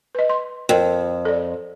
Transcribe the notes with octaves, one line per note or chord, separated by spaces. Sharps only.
B4 D#5
C6
F2 A#4 G5
A4 D5